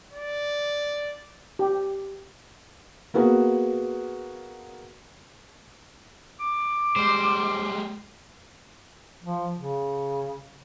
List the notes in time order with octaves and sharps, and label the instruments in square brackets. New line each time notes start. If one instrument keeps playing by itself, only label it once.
[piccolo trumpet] D5
[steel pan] G4
[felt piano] A#3 B3 F#4 G#4 B4
[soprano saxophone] D6
[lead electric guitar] G3 G#3 [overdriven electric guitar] C5
[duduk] F3
C#3